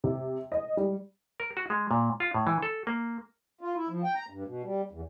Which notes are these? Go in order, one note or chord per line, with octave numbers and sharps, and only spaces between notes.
C3
D#5
G3
A#4
F#4
G#3
A#2
F4
A2
E3
A4
A#3
F4
E4
F3
G5
A#5
G2
B2
G3
E2